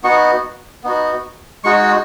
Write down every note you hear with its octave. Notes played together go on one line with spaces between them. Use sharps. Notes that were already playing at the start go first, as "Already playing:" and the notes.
B3 D#4 F#4 C#6
B3 D#4 F#4
G#3 D#4 F#4 C#6